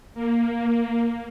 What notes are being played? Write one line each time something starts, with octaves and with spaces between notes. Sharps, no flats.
A#3